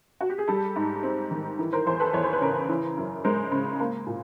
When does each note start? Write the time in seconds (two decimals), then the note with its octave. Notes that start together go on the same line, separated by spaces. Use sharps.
0.21 F#4
0.30 G4
0.38 G#4
0.48 G3 G4 A4
0.76 G#2
1.03 C4
1.31 D#3
1.59 E3
1.73 A#4 C5
1.86 E2 A#4 C5
2.00 A4 B4
2.13 E2 C#5
2.24 C5
2.33 B4
2.41 C#3 A#4 C5
2.69 E3
2.97 F#2
3.24 G#3 A#4 C5
3.52 C#3
3.80 A#3
4.07 A#2